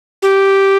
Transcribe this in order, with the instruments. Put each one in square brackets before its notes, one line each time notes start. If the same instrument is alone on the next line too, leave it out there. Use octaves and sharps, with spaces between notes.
[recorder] G4